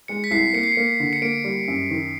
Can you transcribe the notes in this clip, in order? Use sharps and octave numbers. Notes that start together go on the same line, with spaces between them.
G#3 C#7
B6
C2 C7
A#3 C#7
C7
A#3 C#7
D3
C#7
A#3 D7
G3
F#2
D#3